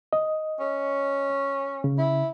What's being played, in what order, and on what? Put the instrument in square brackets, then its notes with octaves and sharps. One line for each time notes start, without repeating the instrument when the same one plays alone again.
[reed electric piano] D#5
[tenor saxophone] C#4
[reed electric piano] C#3
[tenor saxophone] E4